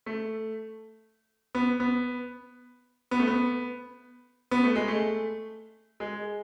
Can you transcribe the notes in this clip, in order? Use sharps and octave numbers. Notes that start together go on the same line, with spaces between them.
A3
B3
B3
B3
A3
B3
B3
A3
G#3
A3
G#3